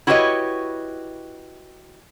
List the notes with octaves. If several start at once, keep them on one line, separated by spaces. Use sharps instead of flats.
E4 F#4 G4 B4 C#5 D#5